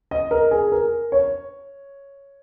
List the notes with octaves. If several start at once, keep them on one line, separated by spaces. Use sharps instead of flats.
D#5
A#4
G#4
A#4
C#5